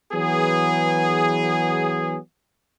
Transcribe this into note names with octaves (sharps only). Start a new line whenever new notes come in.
E3 F#3 B3 G#4